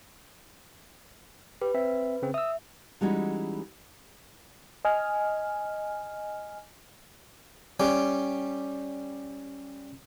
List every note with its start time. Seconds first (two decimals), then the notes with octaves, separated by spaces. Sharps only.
1.61 G4 B4
1.74 C4 E5
2.22 C#3 C4
2.34 E5 D#6 E6
3.01 E3 G3 G#3 C#4 D#4 F#4
4.85 D#5 G#5 F6
7.80 G3 C#4 G4